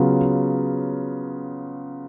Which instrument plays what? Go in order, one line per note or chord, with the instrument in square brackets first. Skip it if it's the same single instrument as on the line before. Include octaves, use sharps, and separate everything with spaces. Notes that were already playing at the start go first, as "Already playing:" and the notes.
Already playing: [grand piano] C#3 F#3 B3 F4